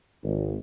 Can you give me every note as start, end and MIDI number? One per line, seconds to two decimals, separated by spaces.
0.24 0.56 32